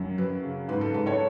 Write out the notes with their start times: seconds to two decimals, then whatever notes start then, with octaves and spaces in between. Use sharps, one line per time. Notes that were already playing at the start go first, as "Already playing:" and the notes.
Already playing: F#2 F#3
0.18 F#2 B4
0.43 C#3
0.68 G#2 B4
0.81 A4
0.94 G#2 B4
1.06 A4 C#5